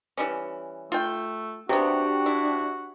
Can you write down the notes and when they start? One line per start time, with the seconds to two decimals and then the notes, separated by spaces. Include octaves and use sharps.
0.17 E3 G3 C#4
0.92 A3 F4 G5
1.69 C3 B3 D4 F#4 G4 C5
2.26 E4